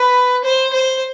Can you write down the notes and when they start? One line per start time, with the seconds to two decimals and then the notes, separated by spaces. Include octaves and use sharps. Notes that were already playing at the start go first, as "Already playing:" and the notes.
Already playing: B4
0.44 C5
0.73 C5